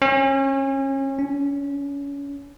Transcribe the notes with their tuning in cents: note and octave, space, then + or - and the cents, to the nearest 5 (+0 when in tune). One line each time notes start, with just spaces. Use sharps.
C#4 -30
C#4 +30